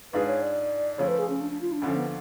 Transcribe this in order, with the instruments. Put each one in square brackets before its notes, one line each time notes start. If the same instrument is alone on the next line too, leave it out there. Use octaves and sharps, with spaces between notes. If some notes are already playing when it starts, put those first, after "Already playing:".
[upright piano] G#2 G#3 D4 F4 G#4 [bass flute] B4
[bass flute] C#5
D5
[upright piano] C#3 F3 A3 [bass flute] C#5
[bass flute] B4
G#4
C#4
D4
D4
F4
D4
[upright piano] D2 D3 F3 [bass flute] C#4
[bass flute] B3